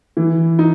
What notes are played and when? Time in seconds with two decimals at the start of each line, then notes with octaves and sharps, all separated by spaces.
0.17 E3
0.59 D#4